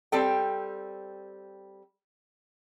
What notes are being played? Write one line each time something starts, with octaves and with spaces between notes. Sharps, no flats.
G3 C4 A4 G5